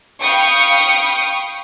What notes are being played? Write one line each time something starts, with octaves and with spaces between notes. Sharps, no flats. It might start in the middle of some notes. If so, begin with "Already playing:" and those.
F5 G5 B5 C#6 D#6 C#7